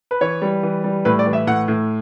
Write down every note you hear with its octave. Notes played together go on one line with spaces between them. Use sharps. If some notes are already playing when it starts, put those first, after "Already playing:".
B4
E3 C#5
G3
E3
G3
A2 B4
D5
E3
E5
A2 F#5
A2